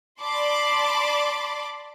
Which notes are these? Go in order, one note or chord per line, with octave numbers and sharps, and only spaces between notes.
D5 A5 B5 C6 D6